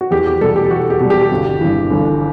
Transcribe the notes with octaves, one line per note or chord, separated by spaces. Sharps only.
F#4
E2 G4
G4
B2 G3 A4
G4
E2 F#4
G4
B2 G3
G4
G1
G2 E3
G1